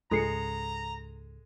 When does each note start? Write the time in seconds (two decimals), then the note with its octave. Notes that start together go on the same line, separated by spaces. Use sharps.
0.11 C#2 G#2 G#3 A4 A#5 C7 C#7